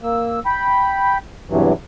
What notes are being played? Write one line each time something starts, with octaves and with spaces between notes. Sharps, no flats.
A#3 E6
G5 B5
E2 G2 C3 E3 F#3